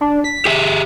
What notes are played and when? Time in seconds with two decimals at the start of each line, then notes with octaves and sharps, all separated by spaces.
0.01 D4
0.24 B6
0.45 G4 G#4 E5